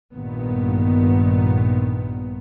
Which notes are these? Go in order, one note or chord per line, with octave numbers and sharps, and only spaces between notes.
A#1 G2 A#2 D#3 B3